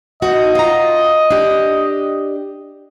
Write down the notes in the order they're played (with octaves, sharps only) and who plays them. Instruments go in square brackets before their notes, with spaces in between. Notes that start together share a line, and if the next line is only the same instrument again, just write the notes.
[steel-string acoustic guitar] D#4 F#4 [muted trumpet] D#5
[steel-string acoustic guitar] F4 A#5
D4 G4